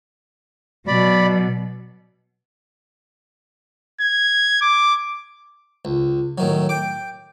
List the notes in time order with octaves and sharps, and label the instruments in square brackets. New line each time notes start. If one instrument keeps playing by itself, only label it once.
[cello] B2 F#3 [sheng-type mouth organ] D5 B5
[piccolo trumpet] G#6
D6
[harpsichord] C#2
A2 D#3 F#3
G5 D6